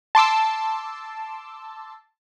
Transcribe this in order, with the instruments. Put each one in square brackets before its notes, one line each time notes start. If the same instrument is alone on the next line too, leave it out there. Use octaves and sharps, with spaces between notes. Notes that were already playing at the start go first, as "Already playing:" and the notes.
[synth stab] A5 C6 D6 E6